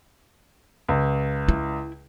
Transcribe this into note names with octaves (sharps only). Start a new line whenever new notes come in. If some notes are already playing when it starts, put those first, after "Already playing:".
C#2
E4